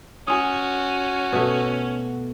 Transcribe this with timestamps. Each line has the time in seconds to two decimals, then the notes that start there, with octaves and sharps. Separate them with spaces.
0.27 C#4 F#4 G#5 D#6
1.33 B2 A3